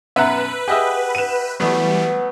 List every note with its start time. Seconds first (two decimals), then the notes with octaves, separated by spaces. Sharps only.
0.16 F#2 B2 B4 E5 F#5 A#5
0.68 G4 G#4 D#5 E5 F#5
1.15 D#7 E7
1.60 E3 F#3 G3 A3 B3 B4 F#5